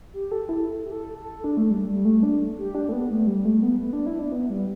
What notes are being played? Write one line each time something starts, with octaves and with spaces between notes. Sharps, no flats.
G4
A4
E4
G4
A4
A4
A4
D4
A3
G3
G3
A3
D4
G4
D4
A3
B3
A3
G3
A3
B3
B3
D4
E4
D4
B3
G3